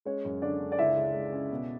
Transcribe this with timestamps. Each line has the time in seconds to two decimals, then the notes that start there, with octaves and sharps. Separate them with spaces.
0.05 G#3 C#4 C#5
0.25 F#2
0.42 D3 D4 D5
0.60 D3
0.72 D5
0.78 C#2 E4 E5
0.96 G#3
1.14 G#3
1.32 C#4
1.51 B2